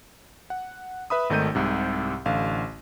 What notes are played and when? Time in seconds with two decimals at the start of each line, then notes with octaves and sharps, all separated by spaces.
0.50 F#5
1.10 B4 E5 B5 D#6
1.30 G#1 D#3 A3 D#4 G6 D#7
1.55 C2 G#2 C3
2.26 A1 D3 F5